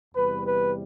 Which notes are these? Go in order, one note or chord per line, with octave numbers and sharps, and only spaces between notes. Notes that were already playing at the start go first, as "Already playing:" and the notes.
E2 C3 G3 B4
B4